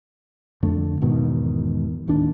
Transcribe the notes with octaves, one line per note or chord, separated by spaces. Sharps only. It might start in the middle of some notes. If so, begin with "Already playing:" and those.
F2 D3 A3
E1 G#2 B2 D#3
D1 D#2 D#3 D4